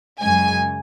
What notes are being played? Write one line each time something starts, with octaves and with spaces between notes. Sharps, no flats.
F#2 C#3 G#3 G#5